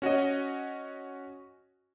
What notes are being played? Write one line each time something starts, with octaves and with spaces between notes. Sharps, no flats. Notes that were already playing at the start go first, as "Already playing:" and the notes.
C#4 F#4 C#5 D#5